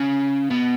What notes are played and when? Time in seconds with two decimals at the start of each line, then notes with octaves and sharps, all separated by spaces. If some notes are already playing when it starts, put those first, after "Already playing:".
Already playing: C#3
0.51 B2